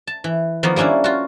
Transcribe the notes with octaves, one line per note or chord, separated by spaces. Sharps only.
A5
E3
D#3 F3 A#3 B3 D#4
G3 A#3 C#4 D4 E4
F4 F#4